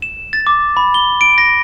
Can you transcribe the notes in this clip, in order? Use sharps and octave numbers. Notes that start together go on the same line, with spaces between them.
E7
A6
D6
B5
G7
D7
A#6